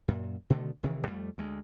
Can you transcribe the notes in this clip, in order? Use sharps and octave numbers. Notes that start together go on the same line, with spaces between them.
F#2 A#2
B2 D3 D#3 A3
F1 C3 D#3 E3
F2 G3 A3
D2 G#3